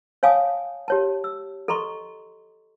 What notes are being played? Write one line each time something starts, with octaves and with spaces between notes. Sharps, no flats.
C#5 F5 G#5 A5 D6 D#6
G4 C#5 A5
E6
A4 D#5 A#5 C6 C#6